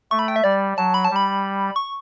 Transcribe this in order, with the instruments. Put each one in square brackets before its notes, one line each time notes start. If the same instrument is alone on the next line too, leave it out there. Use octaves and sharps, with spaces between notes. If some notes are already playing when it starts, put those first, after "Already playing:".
[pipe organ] A3 [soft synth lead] C#6
[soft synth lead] B5
G5
E5
[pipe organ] G3 [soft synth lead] D5
[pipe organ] F#3 [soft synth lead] A5
[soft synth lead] B5
A5
[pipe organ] G3
[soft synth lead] B5
C#6